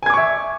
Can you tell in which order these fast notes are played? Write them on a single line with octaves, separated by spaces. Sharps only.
G#5 G#6 D6 C#6 E5